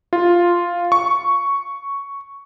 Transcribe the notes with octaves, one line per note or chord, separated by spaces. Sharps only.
F4
C#6